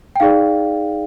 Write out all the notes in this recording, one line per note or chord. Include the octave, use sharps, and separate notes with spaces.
G5
D#4 G#4 D5 F5